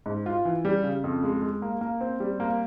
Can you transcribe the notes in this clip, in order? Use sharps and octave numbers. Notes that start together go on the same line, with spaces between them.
G#2
F4
E3
G3
C#3
F2
G#3
G#3
A#3
A#3
C4
G3
A#3